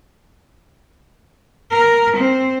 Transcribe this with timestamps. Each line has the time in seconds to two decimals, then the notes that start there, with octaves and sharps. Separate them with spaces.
1.71 A#4
2.17 C4